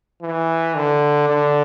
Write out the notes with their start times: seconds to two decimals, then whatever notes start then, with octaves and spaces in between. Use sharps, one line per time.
0.22 E3
0.76 D3
1.29 D3